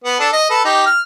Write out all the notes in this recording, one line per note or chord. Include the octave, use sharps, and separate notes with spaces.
B3
D4 A4
D#5
A4 B4
D#4 G4
F6